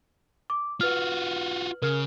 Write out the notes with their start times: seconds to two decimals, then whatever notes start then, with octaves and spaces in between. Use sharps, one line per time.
0.50 D6
0.81 F4 F#4 B4 F6
1.82 C#3 A#4 F6